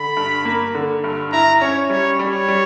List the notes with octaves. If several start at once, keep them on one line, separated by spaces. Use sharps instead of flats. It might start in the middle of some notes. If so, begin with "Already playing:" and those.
Already playing: D3 B5
G2
A#3
D3
G2
E4 A#5
C#4 C#5
G3 C#5
G3 C#5
G3